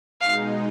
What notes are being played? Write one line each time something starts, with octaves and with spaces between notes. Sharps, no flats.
B2 G#3 D#4 F5